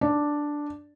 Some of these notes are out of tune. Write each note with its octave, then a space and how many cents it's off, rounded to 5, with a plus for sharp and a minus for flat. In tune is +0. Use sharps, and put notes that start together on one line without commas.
D4 +0 D5 +0